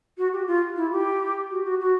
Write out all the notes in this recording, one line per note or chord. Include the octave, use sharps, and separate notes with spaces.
F#4
G4
F4
E4
G4
F#4
F#4
F#4